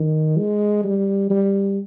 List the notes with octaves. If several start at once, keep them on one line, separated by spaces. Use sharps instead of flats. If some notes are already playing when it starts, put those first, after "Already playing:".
Already playing: D#3
G#3
G3
G3